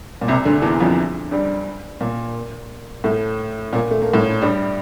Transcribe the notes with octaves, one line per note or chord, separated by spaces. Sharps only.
A#2
C2 C3
D2 D3
E2 E3
F2 F3
G2 G3
A#2 A#3
A2 A3
A#2 A#3
A3
A#3
A2 A3
G2 G3